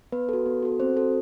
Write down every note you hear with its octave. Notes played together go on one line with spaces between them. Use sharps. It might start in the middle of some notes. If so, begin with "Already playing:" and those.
B3 B4
F#4 A4
B3
F#4 A4
C4 C5
F#4 A4